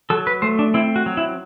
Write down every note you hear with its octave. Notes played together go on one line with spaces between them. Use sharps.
F#3 A4
B4
A3 C5
D4
C4 E4
F#4
F#3
E4